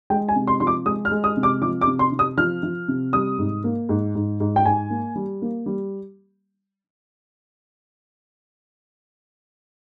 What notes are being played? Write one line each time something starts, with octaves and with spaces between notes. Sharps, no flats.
G#3 G5
G#5
C3
C6
F3 C6
D6
G#3 D#6
F6
G#3
D#6
C3
D6
F3 D6
D6
C3
C6
C3
D#6
F3 F6
F3
C3
G3 D#6
G#2
A#3
G#2
G#2
G#2
G5
G#2 G#5
A#3
G3
A#3
G3